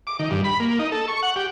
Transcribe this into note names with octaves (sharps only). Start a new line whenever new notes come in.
D6
D#3
G2
B5
A#3
D#4
A4
C#6
F#5
G4